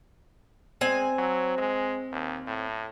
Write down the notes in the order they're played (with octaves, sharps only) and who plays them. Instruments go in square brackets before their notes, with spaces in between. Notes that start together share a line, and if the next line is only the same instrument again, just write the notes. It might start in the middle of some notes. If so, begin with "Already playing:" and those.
[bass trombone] G#3 [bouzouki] C4 G#5
[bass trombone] F#3
G#3
D#2
A2